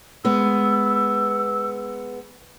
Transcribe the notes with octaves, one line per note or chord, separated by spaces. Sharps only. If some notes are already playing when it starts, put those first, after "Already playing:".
G#3 B3 E6